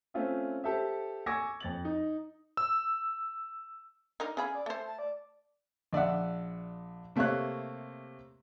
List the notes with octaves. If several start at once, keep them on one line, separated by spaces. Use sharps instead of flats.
A3 C4 C#4 F4 C5 E5
G4 A4 C5 E5
G#5 C#6 D6 E6 G#6 A#6
F2 A6 F#7
D#4
E6
D4 D#4 A#4
C#3 G#4 F5 B5
D5
A3 C5 A5
A5
D5
A#1 D5 E5 F#5
C3 A3 A#3 C4 C#5 F#6